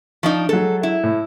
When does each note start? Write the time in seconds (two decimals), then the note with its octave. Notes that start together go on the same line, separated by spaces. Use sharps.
0.23 F3 D4 D#4 C#6
0.49 F#3 G#3 A4
0.83 E4
1.03 A2